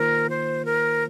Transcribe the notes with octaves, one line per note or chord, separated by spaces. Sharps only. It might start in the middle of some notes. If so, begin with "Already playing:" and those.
Already playing: D#3 A#3 F4 A#4 C5
C5
A#4